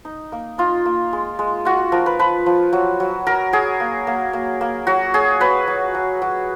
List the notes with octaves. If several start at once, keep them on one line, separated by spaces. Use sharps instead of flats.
D#4
A#3
D#4 F4
A#3
G#3
G#3
F4 F#4
F3 A#4
B4
F3 B4
F3
F#3
F#3
F#3 A#4
F#3 G#4
A#3
A#3
A#3
A#3
F#3 F#4
F#3 G#4
F#3 B4
F#3
F#3
F#3